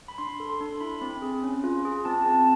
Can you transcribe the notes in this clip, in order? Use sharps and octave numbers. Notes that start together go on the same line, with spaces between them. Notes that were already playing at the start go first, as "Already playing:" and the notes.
B5
D4 C6
A4
C6
D4
E4 B5
C4
G#4
C#4
F4
G#4
C4 A5
C4 A5